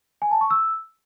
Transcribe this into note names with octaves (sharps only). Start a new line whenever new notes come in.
G#5
A5
C#6
E6